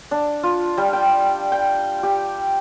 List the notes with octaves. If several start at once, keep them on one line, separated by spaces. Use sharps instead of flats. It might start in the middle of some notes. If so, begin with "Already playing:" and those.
D4
F4
G3
G5
G5
G4